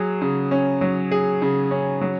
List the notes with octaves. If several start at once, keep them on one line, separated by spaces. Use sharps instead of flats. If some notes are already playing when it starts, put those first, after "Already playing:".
Already playing: F#3 G#4
C#3
C#4
F#3
G#4
C#3
C#4
F#3